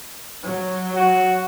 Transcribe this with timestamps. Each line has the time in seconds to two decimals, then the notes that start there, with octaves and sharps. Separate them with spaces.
0.43 F#3
0.95 F#4